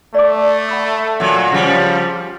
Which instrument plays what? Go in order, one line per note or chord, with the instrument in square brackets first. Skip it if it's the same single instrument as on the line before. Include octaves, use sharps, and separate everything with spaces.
[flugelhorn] A3 [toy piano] D5 D6
[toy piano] F#5 B5 D#6
[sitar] A#2 F#3 [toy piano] F#5
[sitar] C#3 G3 [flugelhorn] F3